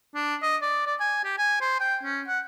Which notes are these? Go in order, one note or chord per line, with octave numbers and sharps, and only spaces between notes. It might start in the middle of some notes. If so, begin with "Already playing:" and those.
D4
D#5
D5
D5
G#5
G4
G#5
C5
G5
C#4
F#5